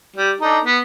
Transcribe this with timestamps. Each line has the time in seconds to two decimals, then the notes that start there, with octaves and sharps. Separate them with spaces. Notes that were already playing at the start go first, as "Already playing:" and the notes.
0.16 G3
0.41 D4 D#4 A4
0.64 B3